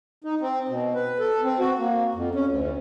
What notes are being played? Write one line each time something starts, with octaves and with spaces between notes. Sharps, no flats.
D#4
C4
B2
B4
A4
C4
F#4
A#3
F2
C#4
D2